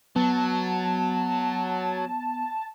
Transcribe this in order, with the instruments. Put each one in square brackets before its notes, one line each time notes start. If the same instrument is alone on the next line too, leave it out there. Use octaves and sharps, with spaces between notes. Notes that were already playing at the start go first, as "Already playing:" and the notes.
[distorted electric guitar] F#3 [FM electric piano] B3 [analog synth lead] A5